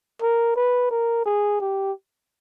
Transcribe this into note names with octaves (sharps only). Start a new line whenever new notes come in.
A#4
B4
A#4
G#4
G4